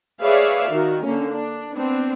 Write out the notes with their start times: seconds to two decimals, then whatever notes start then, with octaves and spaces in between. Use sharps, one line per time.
0.22 G#4 B4 C#5 D5 E5 F5
0.68 D#3 F#4 A#4
1.04 D3 A#3 C#4
1.32 D4
1.73 B3 C4 D4